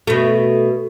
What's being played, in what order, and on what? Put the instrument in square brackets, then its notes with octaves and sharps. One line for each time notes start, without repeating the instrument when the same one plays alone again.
[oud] B2 A3